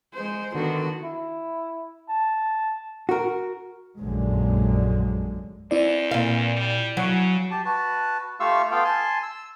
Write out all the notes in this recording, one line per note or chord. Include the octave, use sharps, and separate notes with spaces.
G#3 C5
D3 D#3 B3 F#4
E4
A5
F#4 A#4
F1 A#1 F#2 D3 F#3 G#3
E2 C4 E4 D5
A#2 F5
G3
C#3 F#3
G4 A5
F#4 B4 A5
A3 F4 G4 F5 C#6 E6
B3 F4 A4 F5 G5
G#5 A5 C6
E6